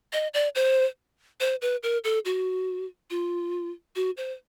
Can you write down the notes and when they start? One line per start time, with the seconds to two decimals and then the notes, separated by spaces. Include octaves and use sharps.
0.13 D#5
0.34 D5
0.55 C5
1.41 C5
1.62 B4
1.83 A#4
2.04 A4
2.25 F#4
3.10 F4
3.96 F#4
4.17 C5